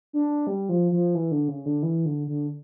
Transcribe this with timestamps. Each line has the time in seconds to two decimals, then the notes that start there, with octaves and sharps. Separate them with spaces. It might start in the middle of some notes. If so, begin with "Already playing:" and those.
0.13 D4
0.47 G3
0.69 F3
0.92 F3
1.15 E3
1.31 D3
1.48 C#3
1.66 D3
1.83 E3
2.06 D3
2.28 D3